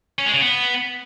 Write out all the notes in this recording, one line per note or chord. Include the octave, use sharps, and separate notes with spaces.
C#4
G#3
C#3
B3